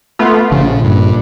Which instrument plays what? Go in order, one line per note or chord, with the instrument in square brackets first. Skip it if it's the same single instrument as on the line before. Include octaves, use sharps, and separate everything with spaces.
[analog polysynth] A3 B3 F4
[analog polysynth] A#1 [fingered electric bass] C#3
[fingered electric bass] G2